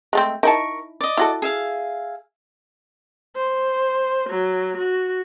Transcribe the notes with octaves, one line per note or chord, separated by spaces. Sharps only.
G#3 A3 C4
D#4 E4 A#4 A5 C#6
D5 D#5
E4 F#4 A4
G#4 E5 F5
C5
F#3
F#4